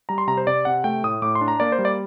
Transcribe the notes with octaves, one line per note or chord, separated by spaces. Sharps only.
G3 A#5
C6
C3 A#5
C5
C3 D5
C3 F#5
A3 G5
A2 D#6
A2 D6
C6
D4
A#5
A#3 D5
C5
G3
D5